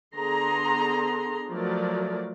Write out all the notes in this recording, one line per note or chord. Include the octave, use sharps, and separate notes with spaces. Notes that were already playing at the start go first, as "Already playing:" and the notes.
D3 B3 G#4 A#5 C6
F3 F#3 A3 A#4 D5